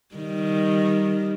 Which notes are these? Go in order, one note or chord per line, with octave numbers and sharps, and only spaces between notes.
D#3 G3